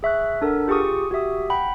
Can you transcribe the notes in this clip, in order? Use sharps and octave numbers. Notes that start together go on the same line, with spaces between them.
G#4 E5 C#6 F#6
D4 A4 A#4 F#5
F4 G4 G#4 C#6 D#6
F#4 G4 E5 D#6
F#5 G5 B5